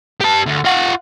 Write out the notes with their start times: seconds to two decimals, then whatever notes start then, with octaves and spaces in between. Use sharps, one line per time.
0.21 G4 A5
0.46 D2
0.65 F4 F#5